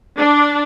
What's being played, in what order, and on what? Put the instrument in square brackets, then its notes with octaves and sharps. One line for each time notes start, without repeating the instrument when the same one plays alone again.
[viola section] D4